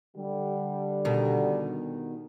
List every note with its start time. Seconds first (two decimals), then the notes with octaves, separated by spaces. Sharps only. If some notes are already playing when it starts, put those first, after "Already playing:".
0.16 D3 G3
1.05 B2 D#3